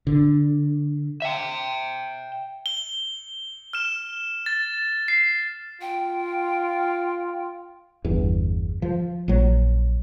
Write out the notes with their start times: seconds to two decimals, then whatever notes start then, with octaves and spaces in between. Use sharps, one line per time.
0.07 D3
1.22 E5 G5
2.66 G7
3.73 F6 E7
4.46 A6
5.08 C7
5.81 F4 G5
8.05 G1 E2
8.82 F3
9.28 A#1 F#3